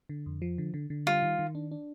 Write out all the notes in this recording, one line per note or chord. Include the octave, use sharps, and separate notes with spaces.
D3
F2
F3
D3
D3
D3
G3 F4
D#3
D#3
D4
D4